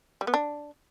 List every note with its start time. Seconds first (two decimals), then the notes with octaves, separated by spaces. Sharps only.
0.21 G3
0.27 B3
0.34 D4